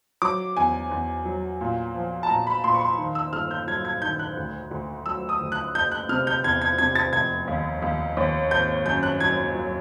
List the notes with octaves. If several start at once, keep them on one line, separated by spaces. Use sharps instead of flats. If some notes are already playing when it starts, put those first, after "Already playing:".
F#3 D6
E2 G#5
E2
F#3
A#2
F3
A5
A#2 A#5
B5
A#2 C6
C#6
C6
D#3
E6
G1 F6
G6
F#3 G#6
G#6
D#3 G6
F#6
D2
D2
F#3 E6
D#6
D2
F#6
F#1 G6
F#6
C3 F6
G6
E2 G#6
G#6
C3 G#6
A6
F1 G#6
D#2
D#2
D#2
G#1 G6
F#2 G6
F#6
F#3 G#6
F#3